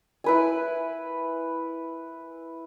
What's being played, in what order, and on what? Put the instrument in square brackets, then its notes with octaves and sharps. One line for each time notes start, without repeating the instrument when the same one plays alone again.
[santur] E4 B4 G#5